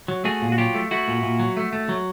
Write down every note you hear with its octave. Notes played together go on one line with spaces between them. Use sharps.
F#3
A3 F#4 G#4
A#2
F#4
F#3 F4 G4
A3
A3 E4 F#4
A#2
A#2
F#3
A3
A3
F#3